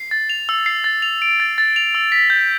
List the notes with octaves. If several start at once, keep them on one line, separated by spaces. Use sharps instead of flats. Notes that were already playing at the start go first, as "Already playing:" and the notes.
Already playing: C7
A6
F7
E6
C7
A6
F7
D7
A6
A6
F7
E6
B6
G6